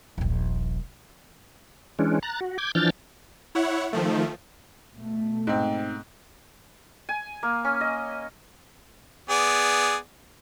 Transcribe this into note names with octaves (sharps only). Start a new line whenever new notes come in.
D#1 A#1
E3 G#3 C#4 D4
A#5 F#6 A6
F#4
D6 G6 G#6
E3 F3 D4 F6 G6 A6
E4 C#5 F#5
D#3 F3 A3
B2 A3
G#2 C4
G#5
A#3
C#4
D#5
B3 G#4 D5